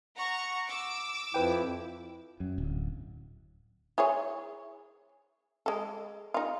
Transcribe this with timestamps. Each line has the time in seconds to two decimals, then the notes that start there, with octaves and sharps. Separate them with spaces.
0.17 F#5 A#5 C#6
0.68 D6 E6
1.34 F2 F3 E4 B4 G5
2.40 F#2
2.58 D1
3.98 E4 G#4 C#5
5.66 G#3 A4
6.34 D#4 F4